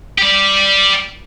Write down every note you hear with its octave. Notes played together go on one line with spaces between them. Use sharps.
G4 D5